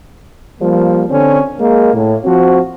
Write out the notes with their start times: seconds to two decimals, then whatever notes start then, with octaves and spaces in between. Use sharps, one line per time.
0.60 F3 G3 A#3
1.10 D3 C4 C#4
1.59 G#3 A#3
1.94 A2
2.24 F3 C4 F#4